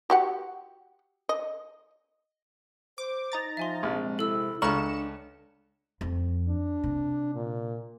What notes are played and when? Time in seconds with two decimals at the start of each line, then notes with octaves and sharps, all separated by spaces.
0.10 F#4 G4 F#5
1.29 D#5
2.98 C5 D6
3.32 D#4 A#5 A6
3.57 F3 E5 G#5 C6
3.83 A#1 C3 G#3
4.19 E4 A4 E6
4.62 C#2 D4 A4 A#5 C#6 F6 C#7 E7
6.01 F2
6.48 D4
6.84 C3
7.34 A#2